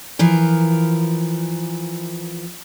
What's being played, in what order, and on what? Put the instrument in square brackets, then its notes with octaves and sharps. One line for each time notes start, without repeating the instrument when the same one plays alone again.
[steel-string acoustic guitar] E3 F3 A#4